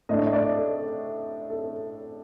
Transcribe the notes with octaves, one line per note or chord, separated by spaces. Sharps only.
A2 A3 D4 D#5
D5
A4
A4